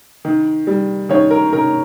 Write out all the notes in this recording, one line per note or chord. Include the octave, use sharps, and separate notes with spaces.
D#3
G3
D#3 C#5
A#4
D#3 A#4